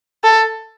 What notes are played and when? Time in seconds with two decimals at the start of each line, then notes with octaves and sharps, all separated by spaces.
0.24 A4